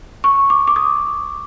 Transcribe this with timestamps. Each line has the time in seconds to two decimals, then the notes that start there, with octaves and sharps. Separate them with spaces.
0.24 C#6
0.50 D6
0.68 D6
0.76 D#6